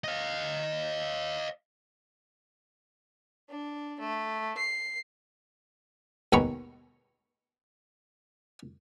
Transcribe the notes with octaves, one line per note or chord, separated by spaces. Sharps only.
D#5 F5
D4
A3
C7
D#2 B2 G#3 A#5 B5 C#6